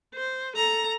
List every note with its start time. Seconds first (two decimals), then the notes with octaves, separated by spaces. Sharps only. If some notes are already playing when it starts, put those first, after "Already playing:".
0.15 C5
0.56 A4 A#5